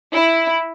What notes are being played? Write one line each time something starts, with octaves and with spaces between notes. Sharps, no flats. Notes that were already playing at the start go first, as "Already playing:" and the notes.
E4